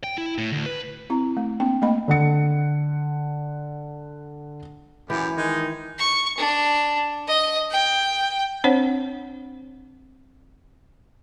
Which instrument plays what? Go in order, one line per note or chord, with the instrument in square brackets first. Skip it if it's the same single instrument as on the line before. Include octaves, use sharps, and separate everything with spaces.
[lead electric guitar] G5
E4
A2
D2
B4
[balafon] C4 E4 A#5
A3
A#3 C4 D4 G5
A3 A#3 D#5 B5
[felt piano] D3 F#5 C#7
[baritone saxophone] F#2 [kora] E3 [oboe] G4
[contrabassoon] D#3 [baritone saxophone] G#3 [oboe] D#4
[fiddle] C#6
D4
D#5
G5
[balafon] C4 D4 C5 C#5 F#5